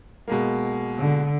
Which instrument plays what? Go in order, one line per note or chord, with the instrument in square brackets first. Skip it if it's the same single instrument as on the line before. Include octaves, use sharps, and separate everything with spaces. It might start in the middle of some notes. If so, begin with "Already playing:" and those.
[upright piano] B2 G#3 A#3
[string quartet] D3